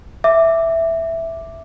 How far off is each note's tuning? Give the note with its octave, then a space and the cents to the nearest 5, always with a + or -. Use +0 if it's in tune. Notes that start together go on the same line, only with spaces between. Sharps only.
E5 +0 D6 +0